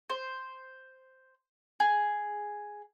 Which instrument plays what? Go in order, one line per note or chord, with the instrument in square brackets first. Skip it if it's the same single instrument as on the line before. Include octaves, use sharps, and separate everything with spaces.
[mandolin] C5
G#4